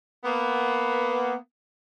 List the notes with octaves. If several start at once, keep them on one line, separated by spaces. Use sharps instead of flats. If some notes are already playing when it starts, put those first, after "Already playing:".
A#3 B3